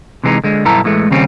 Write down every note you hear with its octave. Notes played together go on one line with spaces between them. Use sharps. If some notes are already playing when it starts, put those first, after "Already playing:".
C3 E3 G#3 C4 D#4
D3 G#3
B1 G2 B3 E4 A4 A#5
A2 E3 G#3 A3
D#2 C#3 G3 C4 C#4